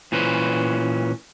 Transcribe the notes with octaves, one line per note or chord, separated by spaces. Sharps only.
A#2 E3 C#4 B4 C5